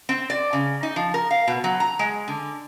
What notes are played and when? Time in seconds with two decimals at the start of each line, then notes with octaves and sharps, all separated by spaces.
0.09 C4
0.30 D5
0.53 C#3
0.83 D#4
0.96 F3
1.14 A#4
1.31 F5
1.48 B2
1.64 F#3
1.80 A#5
1.99 G#3
2.28 D3